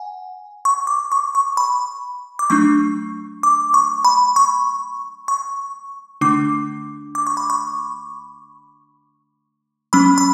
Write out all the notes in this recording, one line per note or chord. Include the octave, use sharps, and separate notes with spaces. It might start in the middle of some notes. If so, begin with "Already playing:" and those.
Already playing: F#5 G#5
C#6
D6
C#6
C#6
B5
D6
F#3 A3 D4 C#6
D6
C#6
B5
C#6
C#6
D3 A3 D4 D6
D6
C#6
B5
C#6
F#3 C#4 B5
B5